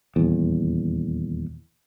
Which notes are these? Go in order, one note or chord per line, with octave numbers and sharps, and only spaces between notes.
D#1 E2